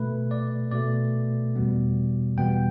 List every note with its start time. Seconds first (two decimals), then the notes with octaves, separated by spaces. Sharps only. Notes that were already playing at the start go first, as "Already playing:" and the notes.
Already playing: B2 A3 B4
0.31 D5
0.71 B2 A3 D5
1.55 E2 B2 G3 B3
2.38 E2 B2 G3 B3 G5